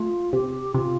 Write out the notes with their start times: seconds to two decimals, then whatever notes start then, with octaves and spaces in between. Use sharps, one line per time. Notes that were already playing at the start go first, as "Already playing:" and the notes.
Already playing: A3 F4
0.33 C3 G4
0.74 C3 F4